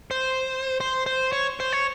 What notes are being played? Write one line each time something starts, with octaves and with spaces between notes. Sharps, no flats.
C5
C5
C5
C#5
C5
C#5